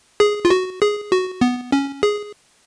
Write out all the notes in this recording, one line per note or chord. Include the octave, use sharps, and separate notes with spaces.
G#4
F4
F#4
G#4
F#4
B3
C#4
G#4